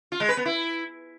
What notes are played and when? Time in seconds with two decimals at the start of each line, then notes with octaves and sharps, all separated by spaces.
0.12 F4
0.20 G#3
0.29 B4
0.37 B3
0.45 E4